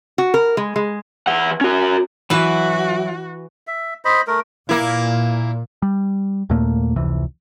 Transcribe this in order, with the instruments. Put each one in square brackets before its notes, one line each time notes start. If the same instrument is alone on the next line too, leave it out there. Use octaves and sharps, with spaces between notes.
[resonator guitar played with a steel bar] F#4
A#4
G#3
G#3
[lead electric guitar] E3 F#5
C#4 F#4
[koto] E3 B4 [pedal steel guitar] F#3 E4 [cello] F#4
[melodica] E5
C5 D#5 B5
A3 A#4
[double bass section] A#2 [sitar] A#3 E4
[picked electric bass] G3
D#2 A#2 A3 A#3
F1 C#2 C3 E3